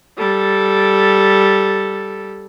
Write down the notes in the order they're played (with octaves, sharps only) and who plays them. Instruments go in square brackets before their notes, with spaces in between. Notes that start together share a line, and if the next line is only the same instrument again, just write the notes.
[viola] G3 A4